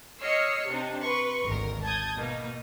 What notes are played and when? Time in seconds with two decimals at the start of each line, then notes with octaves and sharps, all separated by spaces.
0.20 C#5 D#5 E6 F6 C7 C#7
0.68 C3 C4 D4 D#4
1.01 B4 C6 C#6
1.44 G#1 D2 A#4
1.83 A5 D#6 G6 G#6
2.17 B2 A#3 D#4